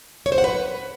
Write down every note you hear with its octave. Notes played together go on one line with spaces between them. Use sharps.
C#5
C5
F#5
B4